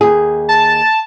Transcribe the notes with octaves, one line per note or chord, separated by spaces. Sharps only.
D#2 G#4
A5